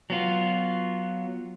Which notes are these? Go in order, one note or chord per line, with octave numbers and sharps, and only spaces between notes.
F#3 B3 F4